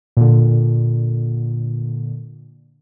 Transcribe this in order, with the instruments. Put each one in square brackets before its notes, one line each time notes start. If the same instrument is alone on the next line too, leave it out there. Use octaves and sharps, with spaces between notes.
[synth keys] A#2 D3